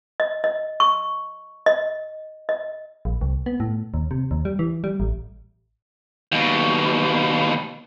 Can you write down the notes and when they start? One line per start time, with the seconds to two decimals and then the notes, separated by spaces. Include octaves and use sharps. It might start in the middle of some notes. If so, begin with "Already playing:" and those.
0.20 D#5
0.44 D#5
0.80 C#6
1.66 D#5
2.49 D#5
3.05 A#1
3.21 C2
3.46 B3
3.60 A2
3.94 D#2
4.11 C3
4.31 D#2
4.45 G3
4.59 E3
4.84 G3
5.00 A1
6.32 D#2 B2